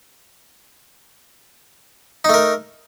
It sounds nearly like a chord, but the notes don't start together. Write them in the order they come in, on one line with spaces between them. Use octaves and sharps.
D#4 A3 A#4